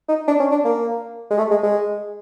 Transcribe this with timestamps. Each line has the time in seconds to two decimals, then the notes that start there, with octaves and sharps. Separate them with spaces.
0.09 D#4
0.28 D4
0.40 C#4
0.51 D4
0.65 A#3
1.30 G#3
1.38 A3
1.51 G#3
1.63 G#3